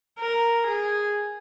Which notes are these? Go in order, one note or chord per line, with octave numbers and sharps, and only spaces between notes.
A#4
G#4